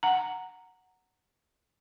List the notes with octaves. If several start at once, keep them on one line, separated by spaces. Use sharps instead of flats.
F#5 A#5